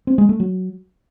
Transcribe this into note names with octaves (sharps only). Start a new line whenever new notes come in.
C4
G#3
A3
F#3